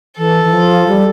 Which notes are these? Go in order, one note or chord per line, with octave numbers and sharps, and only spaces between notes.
E3 A4
E3
F3
G3